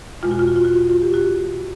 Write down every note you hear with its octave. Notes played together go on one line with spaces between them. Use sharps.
E2 B2 G#3 F4
F#4
F4
F#4
F4
F#4
F4
F#4
F4
G4
F#4